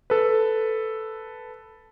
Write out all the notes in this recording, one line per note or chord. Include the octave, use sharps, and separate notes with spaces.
A4 B4